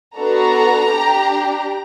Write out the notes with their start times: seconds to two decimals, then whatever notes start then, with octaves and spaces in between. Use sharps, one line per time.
0.16 B3 D4 F#4 A4 A#5
0.91 D4 G4